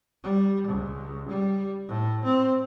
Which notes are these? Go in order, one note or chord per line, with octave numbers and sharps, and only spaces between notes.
G3
C#2
G3
A2
C4